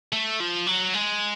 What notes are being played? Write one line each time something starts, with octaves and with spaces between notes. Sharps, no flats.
A3
F3
F#3
G#3